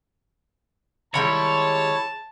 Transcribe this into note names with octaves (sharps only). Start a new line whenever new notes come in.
D#3 G3 G#3 E4 C#5 A5